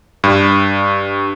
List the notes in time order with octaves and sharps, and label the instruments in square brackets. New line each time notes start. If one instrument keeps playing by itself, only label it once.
[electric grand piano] G2